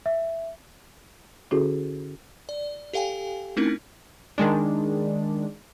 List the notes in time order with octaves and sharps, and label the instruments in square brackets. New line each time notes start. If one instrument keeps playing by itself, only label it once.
[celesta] E5
[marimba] D3 C#4 E4 F#4 G#4 A4
[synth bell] D5
G4 A4 F5 G5 G#5
A3 C4 C#4 D#4 E4 A#4
[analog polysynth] D#3 G#3 D4